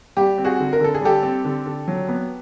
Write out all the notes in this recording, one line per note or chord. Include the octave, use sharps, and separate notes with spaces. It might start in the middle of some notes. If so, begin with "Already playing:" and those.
G3 G4
C4
F#4 G#4
D3
A#4
D3 A4
G#4
G3 G4 A4
C4
D3
D3
F#3
B3